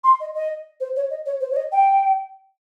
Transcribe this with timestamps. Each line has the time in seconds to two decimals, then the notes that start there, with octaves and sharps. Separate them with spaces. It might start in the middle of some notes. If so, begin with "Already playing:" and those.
0.04 C6
0.20 D#5
0.34 D#5
0.80 C5
0.96 C#5
1.10 D#5
1.25 C#5
1.40 C5
1.50 C#5
1.56 D#5
1.72 G5